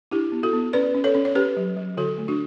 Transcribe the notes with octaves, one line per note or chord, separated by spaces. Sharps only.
D4 E4 G4
B3
F#4 A4
B3
C#4 B4 D5
C#4
A4 C#5
C#4
C#5
C#4 G4 B4
F#3
F#3
D3 F#4 A4
A3
D4 F#4